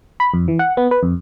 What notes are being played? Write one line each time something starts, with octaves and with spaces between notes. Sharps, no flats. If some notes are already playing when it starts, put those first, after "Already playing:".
B5
F2
E3
F#5
B3
B4
F2